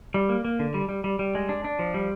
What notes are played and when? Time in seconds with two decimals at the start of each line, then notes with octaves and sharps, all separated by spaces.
0.14 G3
0.29 A#3
0.45 A#3
0.59 D3
0.74 G3
0.89 G3
1.04 G3
1.19 G3
1.35 G#3
1.49 D4
1.64 D4
1.79 F3
1.94 G3